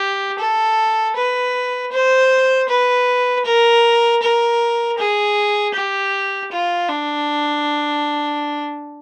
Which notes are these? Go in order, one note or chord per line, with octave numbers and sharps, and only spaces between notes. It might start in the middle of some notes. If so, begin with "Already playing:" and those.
Already playing: G4
A4
B4
C5
B4
A#4
A#4
G#4
G4
F4
D4